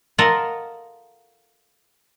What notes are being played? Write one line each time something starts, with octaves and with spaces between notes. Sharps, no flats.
F4 A4 A#4 D#5 F5 F#5